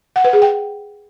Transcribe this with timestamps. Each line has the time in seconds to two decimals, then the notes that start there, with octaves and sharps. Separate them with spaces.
0.16 F#5
0.24 B4
0.33 G#4
0.42 G5